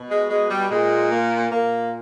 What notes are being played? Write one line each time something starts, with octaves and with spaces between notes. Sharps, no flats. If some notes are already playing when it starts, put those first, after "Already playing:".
Already playing: B2
G#3
G#3
G3
A#2 G#3
A#3
A#2 A#3